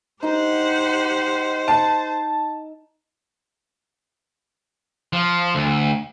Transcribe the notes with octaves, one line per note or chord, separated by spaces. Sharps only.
D#4 G4 C5 D#5 F#5
A5
F3
D2